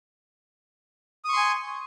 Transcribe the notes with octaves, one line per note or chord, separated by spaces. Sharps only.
G#5 C6 C#6 D#6